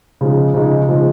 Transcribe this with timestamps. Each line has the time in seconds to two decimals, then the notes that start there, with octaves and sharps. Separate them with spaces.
0.21 C#3 F3 G#3 D#4
0.54 C#3 F3 G#3 D#4
0.88 C#3 F3 G#3 D#4